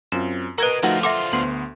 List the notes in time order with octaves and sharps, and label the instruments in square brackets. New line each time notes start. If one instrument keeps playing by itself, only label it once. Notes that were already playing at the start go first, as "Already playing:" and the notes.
[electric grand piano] F#2 C4 F4 [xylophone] E7
[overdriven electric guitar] F#4 D#5 [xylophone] A#4 B4 [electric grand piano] A#5 G#6 D7
[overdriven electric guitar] D3 F4 [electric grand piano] F3 A3 [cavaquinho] D#4 F#4 E5
[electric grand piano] A4 [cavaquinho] C5 [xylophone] E5 F#5 D6
[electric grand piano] D2 B3 C6 [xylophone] C7 F#7